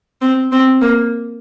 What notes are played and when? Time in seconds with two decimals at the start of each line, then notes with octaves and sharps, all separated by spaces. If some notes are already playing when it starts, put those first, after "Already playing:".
0.22 C4
0.52 C4
0.81 A#3